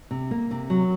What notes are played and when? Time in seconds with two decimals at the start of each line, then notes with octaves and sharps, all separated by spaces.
0.11 C3
0.31 A#3
0.51 C3
0.70 F#3